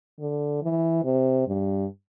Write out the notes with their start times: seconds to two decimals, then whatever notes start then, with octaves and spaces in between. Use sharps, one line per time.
0.20 D3
0.62 E3
1.04 C3
1.47 G2